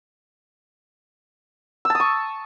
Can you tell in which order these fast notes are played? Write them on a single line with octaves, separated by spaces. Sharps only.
E6 A5 D#6 C#6